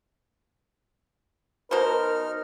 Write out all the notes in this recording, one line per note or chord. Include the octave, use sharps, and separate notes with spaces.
B2 D#4 A#4 C5 F6